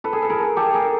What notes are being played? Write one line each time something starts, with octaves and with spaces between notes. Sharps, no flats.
A4 B4
G#4
A4
G#4 A#4
G4 A4
G#4 A#4